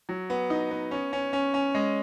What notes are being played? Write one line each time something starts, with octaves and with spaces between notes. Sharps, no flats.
F#3
B3
D#4
B3
C#4
C#4
C#4
C#4
G#3